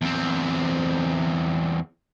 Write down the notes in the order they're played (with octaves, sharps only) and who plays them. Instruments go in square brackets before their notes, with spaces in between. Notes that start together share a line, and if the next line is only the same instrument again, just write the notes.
[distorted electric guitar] E2 C4